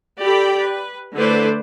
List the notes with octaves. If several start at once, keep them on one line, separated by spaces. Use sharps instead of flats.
G4 A4 D5 G5 B5
B4
D3 A3 E4 B4 C5 D5